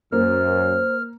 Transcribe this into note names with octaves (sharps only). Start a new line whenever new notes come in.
F#2 A#3 C5 F6